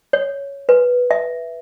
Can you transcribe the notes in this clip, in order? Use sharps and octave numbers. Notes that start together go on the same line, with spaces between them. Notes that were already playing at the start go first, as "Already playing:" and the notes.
C#5
B4
E5